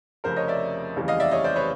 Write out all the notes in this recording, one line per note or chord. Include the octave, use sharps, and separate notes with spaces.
F1 F2 C#3 A#4 C5
C#5 D#5
D5 E5
F1 D#2 C#3 E3 G3
D#5 F5
D5 E5
C#5 D#5
C5 D5
B4 C#5